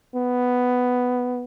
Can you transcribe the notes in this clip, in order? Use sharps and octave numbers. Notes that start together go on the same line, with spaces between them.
B3